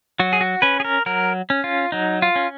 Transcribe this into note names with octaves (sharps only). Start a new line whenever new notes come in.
F#3 F#4
G#4
F#4
C#4 B4
G#4
A#4
F#3 A#4
C#4
F4
F#3 D#4
F4
C#4